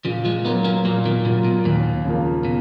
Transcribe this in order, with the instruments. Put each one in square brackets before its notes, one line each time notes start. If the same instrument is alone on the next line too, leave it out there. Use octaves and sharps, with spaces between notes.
[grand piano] A#2 [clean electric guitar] C#3 F3
[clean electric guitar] F3 G#3
[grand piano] F#3 A#3 F4 [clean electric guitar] B3 D#4
[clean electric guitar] A#3 C#4
[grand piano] A#2 [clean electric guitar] F#3 A#3
[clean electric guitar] B2 D#3
[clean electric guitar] A#2 C#3 [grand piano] F#3 A#3 F4
[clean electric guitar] B2
[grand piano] D#2 [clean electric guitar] A#2
[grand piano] C#3 F3 A#3
[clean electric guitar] B2